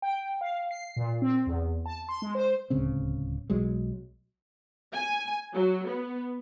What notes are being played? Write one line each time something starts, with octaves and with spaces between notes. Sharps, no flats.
G5
F5
C7
A#2
C4
E2
A5
C6
G#3
C5
D1 C#2 C#3 C4
B1 F#3 G#3
G#5
F#3
B3